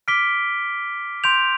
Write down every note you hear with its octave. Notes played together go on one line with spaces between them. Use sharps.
D6 F6 B6 D7 G7
C6 G6 D7 F7